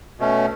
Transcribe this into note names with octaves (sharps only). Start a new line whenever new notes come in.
B2 A3 C#4